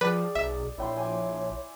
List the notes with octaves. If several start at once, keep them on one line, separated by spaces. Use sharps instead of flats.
F3 G#4 B4 D5 G5
B1 E5
A#1 E4 C#5 G5 C6
C#5 G#5 D6